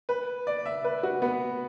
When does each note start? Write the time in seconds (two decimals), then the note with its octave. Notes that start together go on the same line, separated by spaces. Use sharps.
0.09 B4
0.47 D5
0.66 E5
0.84 B4
1.03 F#4
1.22 B3